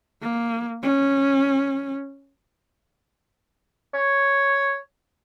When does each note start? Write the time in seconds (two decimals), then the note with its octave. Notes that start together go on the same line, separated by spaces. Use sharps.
0.22 A#3
0.83 C#4
3.94 C#5